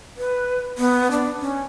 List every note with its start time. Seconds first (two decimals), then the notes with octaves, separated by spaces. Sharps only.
0.17 B4
0.78 B3
1.11 D4
1.40 C#4